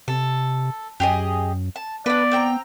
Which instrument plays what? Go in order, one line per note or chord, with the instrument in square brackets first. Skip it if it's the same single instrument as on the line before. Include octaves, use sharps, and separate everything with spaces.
[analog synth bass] C3 [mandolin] A4
[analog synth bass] F#2 [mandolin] G4 G#4 D#5
[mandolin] A5
[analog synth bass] B3 [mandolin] D4 B4 [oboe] D5
[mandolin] C4 G5 A#5